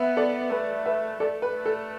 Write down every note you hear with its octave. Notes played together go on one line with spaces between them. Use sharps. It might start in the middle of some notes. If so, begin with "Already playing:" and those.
Already playing: B3 B4 E5
A4 D5
A3 B4
B4 E5
A3 A4 D5
B4
A3
A4